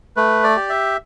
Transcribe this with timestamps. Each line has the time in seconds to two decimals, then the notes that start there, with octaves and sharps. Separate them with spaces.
0.17 A3 B4
0.44 D5
0.57 G4
0.69 E5